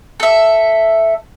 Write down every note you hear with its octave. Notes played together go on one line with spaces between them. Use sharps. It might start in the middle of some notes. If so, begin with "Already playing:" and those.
A4 E5